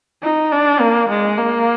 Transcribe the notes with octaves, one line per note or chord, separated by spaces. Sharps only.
D#4
D4
A#3
G#3
A#3